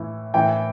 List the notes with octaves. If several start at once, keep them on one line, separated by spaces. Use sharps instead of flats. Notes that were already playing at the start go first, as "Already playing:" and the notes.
Already playing: A2 E3
A2 E3 G5